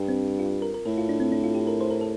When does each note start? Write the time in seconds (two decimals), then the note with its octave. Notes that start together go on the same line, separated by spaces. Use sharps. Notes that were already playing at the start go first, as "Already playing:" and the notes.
Already playing: G2
0.08 C4
0.39 F4
0.62 A#4
0.74 A#4
0.85 A2 A4
0.98 F4
1.09 D4
1.20 C4
1.32 D4
1.44 F4
1.55 G4
1.67 A#4
1.81 C5
1.91 A#4
2.01 A4